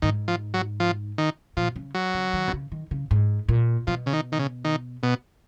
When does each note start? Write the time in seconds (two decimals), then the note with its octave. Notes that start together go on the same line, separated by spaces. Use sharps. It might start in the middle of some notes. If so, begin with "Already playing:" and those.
0.02 G#2 D#3
0.28 F3
0.54 F#3
0.80 F3
1.18 D#3
1.57 A#2 F3
1.76 C#3
1.95 F#3
2.14 C#3
2.33 D#3
2.48 B2
2.53 C#3
2.72 D#3
2.91 C#3
3.11 G#2
3.49 A#2
3.87 B2 F3
4.06 C#3
4.13 D#3
4.32 D#3
4.39 C#3
4.64 D#3
5.03 B2